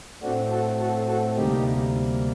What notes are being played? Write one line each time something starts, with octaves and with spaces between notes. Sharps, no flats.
A2 A3 C4 D4 F#4
F#4 A4
F#4 A4
F#4 A4
D2 C3 G3 A#3 D#4 G4